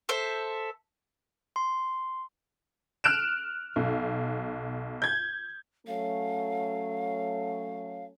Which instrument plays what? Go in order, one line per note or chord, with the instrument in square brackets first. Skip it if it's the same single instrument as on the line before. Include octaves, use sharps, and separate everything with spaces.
[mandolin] A4 C5 E5
[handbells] C6
[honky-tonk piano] F6 F#6 D7 E7
B1
G6 G#6
[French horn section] F#3 A3 C#4 [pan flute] F5